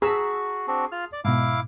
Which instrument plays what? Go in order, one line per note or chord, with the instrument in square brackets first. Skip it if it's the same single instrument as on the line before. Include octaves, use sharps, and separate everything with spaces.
[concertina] F#4 [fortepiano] G#4 A5 [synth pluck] A#5 E6 B6
[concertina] C4 D4 F#4
F4 F6
D5
[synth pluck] G#2 B2 [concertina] E4 F5 D6